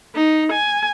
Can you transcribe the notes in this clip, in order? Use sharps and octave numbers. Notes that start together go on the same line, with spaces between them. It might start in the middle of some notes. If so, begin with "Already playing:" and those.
D#4
G#5